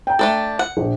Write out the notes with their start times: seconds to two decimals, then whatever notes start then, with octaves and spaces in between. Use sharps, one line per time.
0.07 G5 A#5
0.19 A3 D4 A4
0.59 F#5
0.77 A#1